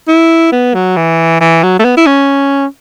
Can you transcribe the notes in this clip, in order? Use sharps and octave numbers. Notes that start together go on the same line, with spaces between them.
E4
B3
F#3
E3
E3
F#3
A3
B3
E4
C#4